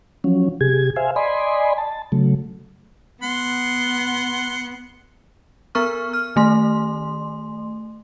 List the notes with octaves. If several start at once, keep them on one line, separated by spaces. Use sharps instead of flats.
F3 F#3 C#4
C3 G4 G#4 G#6
C5 E5 F5 G#5
D5 D#5 G#5 B5 C6
A5
C#3 F#3 A3
B3 F#5 C6
B3 A#4 C#6 F6
F6
D#3 A3 C6